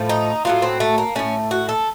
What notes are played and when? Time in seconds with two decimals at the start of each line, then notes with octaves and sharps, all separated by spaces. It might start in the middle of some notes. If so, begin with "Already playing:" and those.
Already playing: A2 F3 A3
0.09 D#4
0.45 A2 F#3 A3 F4
0.62 C4
0.80 A3
0.98 A#3
1.15 A2 A3 C#4
1.51 F#4
1.69 A4